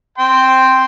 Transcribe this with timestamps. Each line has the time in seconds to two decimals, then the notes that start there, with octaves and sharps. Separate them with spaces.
0.18 G5 C6